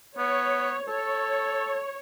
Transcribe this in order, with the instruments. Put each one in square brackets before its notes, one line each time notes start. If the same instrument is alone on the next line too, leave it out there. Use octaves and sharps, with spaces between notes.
[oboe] B3 [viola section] C#5
[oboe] A4 [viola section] C#5